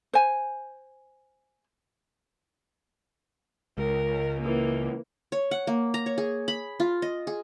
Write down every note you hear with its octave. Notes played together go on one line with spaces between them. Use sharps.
C5 G#5
C#2 A#4
E3 A#3
C#5
F#5
A#3
A#5
C#5
G#4
B5
F4
D#5
G#4